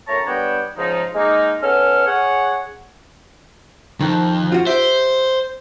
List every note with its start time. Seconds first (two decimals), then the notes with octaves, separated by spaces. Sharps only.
0.08 F#2 A2 C#5 A5 A#5
0.27 G3 B3 D4 C#5 G5
0.77 G#2 C#3 F3 D#4
1.15 G#3 A#3 D#4
1.62 B3 C#4 A4 F6
2.06 G#4 C#5 F#5
4.01 F2 D#3
4.52 F4 F#4
4.67 G4 C5 E5